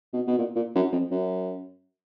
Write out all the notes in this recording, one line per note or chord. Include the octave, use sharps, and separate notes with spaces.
B2
B2
A#2
A#2
F#2
F2
F#2